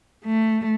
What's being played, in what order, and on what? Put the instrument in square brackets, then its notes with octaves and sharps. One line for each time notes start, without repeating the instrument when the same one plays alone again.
[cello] A3